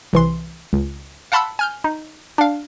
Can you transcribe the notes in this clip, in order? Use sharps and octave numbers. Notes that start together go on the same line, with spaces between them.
C2 E3 C6
C#2
F5 F#5 A5 B5 C6 E6
G#5 F6 G6
D#4
D4 F5